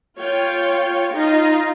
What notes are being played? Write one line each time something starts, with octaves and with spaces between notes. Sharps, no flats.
F4 C#5 G5
D#4 F4